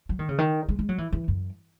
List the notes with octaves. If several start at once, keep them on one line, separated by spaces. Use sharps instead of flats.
F#3
D#3
C#3
D#3
G#3
G#3
F#3
E3
E3
F#2